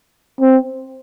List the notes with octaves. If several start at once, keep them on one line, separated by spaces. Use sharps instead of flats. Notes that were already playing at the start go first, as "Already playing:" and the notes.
C4